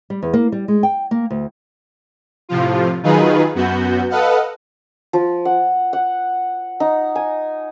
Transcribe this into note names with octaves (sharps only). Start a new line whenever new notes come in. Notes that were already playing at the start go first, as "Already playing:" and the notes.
G3
E2
A#3
G3
G#3
G5
A#3
D2
A2 C3 F3 F4
D#3 F#3 D#4 F4 G#4 B4
F#2 B3 F#4 G6
A4 B4 D#5 F5 F#5
F3
F#5
F#5
D#4
G#5